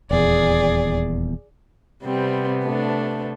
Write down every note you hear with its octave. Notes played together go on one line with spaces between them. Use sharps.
D#1 E2 G#4 D5
C3 G3 B3 C4
A3 D4